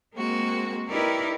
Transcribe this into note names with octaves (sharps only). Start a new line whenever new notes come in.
G#3 A#3 C4 F#4
D#4 E4 G4 A#4 B4 D5